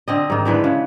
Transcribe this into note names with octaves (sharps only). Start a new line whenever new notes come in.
D3 C4 D#5
G#2 D#3
D3 E3 G#3 B4
C#3